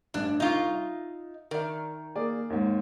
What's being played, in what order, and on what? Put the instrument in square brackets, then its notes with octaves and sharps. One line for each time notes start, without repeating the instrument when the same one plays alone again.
[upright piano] A1 G2 [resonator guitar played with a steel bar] D4
[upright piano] C2 C#6 [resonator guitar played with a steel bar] D#4 F4
[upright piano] E5
[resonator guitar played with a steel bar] D#3 [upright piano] A#4 D5 E5
[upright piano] A#3 G#4 D5
D#2 G#2